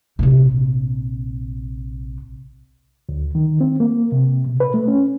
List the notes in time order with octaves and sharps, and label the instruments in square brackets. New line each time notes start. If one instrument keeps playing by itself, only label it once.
[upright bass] A#1 C3
[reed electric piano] D2
D#3
C4
A#3
C3
B2
B4
A3
C#4